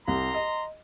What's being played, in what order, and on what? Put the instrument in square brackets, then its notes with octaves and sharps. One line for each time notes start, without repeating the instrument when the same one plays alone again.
[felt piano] C2 [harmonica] A#5 C6
[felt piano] D#5